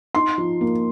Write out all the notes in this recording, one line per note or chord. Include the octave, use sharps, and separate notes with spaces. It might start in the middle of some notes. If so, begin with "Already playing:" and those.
D#4 C6
F3
A#3